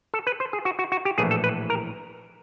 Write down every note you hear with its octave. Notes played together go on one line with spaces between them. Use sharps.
A4
B4
C5
G#4
F#4
F#4
F#4
G4
A#1 A2 E3 G#4
A4
B4
A#4